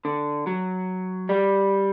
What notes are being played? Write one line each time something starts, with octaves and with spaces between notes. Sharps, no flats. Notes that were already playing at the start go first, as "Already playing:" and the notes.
D3
F#3
G3